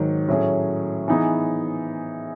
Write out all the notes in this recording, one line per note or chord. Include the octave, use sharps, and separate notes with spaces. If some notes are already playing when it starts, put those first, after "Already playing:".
Already playing: G#2 D#3 F#3
A2 F#3 A3 C#4 G#4
E3 B3 D#4 G#4